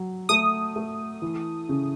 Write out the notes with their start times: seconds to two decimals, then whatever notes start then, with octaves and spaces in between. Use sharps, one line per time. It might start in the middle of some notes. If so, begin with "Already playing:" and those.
Already playing: F#3
0.29 A3 D#6
0.76 A3
1.22 E3
1.69 C#3